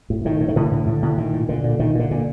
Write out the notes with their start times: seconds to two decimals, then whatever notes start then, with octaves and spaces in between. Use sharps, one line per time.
0.10 A2
0.25 A2 D#3
0.41 A2
0.48 D#3
0.56 A2 D3 E3
0.71 A2
0.86 A2 D3
1.02 A2
1.18 A#2 D#3
1.33 A#2
1.49 A#2 D3
1.64 A#2
1.79 A#2 D#3
1.95 A#2 D3
2.11 A#2